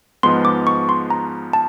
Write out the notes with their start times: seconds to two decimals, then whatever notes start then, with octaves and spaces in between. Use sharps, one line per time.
0.23 G#2 F3 G#3 B3 C6
0.45 D6
0.67 C#6
0.89 C6
1.10 A#5
1.53 A5